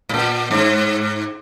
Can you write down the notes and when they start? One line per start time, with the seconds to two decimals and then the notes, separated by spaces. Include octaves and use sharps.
0.09 A2
0.14 A#2
0.51 G#2